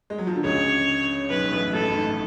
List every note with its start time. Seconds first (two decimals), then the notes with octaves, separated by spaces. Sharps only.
0.10 G#3
0.18 F#3
0.27 F3
0.36 D3
0.44 C#2 C#3 C#5
1.30 B1 B2 B4
1.52 A1 A2
1.73 A1 A2 A4
1.88 A2
1.94 G#1 G#2